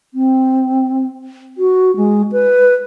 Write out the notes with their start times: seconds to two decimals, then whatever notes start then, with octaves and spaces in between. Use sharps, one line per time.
0.14 C4
1.58 F#4
1.97 G#3
2.32 B4